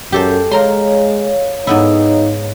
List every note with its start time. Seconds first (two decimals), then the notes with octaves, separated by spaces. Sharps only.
0.12 F#2 G4 A4 C5
0.51 G#3 A#4 C#5 F5 A#5 C6
1.67 G#2 B3 D#4 E4